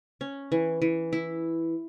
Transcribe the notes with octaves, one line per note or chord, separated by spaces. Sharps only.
C#4
E3
E3
E4